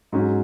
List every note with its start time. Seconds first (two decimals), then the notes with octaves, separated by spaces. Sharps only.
0.12 G#2 F#3 C#4